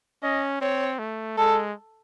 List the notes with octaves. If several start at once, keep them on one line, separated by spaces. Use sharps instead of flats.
C#4 D#5
C4 C#5
A3
G#3 A4